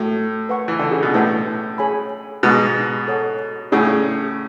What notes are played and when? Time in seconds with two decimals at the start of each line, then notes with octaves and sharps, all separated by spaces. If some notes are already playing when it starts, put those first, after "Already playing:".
Already playing: A2 F#4 A4 E5
0.49 B4 F#5 C#6
0.68 E3
0.79 D3
0.91 C#3
1.03 B2
1.14 A2 E4 B4 F#5 A5
1.78 G#4 C#5 G#5 B5
2.43 G#2 B2 F#4 B4 F#5 A5 C#6
3.08 A4 C#5 F#5
3.72 A2 C#3 C#4 E4 G#4 D5 F#5